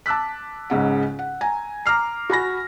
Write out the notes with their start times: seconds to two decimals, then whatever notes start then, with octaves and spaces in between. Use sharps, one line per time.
0.06 A5 D6 E6 F#6 B6
0.70 C#2 G#2 C#3 F#5
1.19 F#5
1.41 G#5 A#5
1.86 A#5 D6 F6 C7
2.30 F#4 G#5 B5 A#6